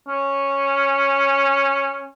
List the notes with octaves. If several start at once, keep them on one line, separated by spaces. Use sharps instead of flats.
C#4